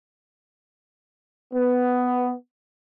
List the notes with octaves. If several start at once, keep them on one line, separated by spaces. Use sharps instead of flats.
B3